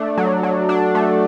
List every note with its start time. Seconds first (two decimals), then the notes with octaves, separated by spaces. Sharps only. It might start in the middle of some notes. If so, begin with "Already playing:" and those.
Already playing: A3 D4
0.17 F#3
0.43 F#3
0.69 D4
0.95 A3